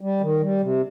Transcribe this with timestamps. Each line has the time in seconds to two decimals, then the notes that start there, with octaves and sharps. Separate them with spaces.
0.01 G3
0.21 D#3
0.41 G3
0.61 C3